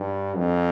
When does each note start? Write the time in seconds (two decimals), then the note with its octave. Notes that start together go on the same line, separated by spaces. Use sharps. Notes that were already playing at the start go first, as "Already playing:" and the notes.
Already playing: G2
0.37 F2